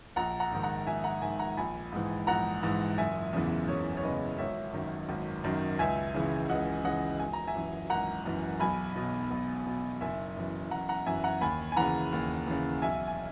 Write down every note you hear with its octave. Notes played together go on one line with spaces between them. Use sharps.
A#1 F#5 A#5
F#5 A#5
G#2 D#3
F#5 A#5
A#1 E5 G#5
F#5 A#5
G#2 D#3 E5 G#5
F#5 A#5
A#1 G#5 B5
G#2 E3
A#1 F#5 A#5
G#2 E3
F#1 E5 G#5
E2 C#3 E3
F#1 C#5
C#5
E2 C#3 E3 B4 D#5
G#1 C#5 E5
F#2 D#3
G#1
F#2 D#3
C#2 E5 G#5
C#3 E3
C#2 D#5 F#5
C#3 E3 D#5 F#5
G#1 G#5
A#5
E5 G#5
F#2 E3
G#1 F#5 A#5
F#2 E3
B1 G#5 B5
B2
B1
B2
F#1 E5 G#5
F#2 E3
F#1 F#5 A#5
F#5 A#5
F#2 E3 E5 G#5
F#5 A#5
D#2 G#5 B5
G#5
C#3 E3 F#5 A#5
D#2
C#3 E3
B1 E5 G#5
G#5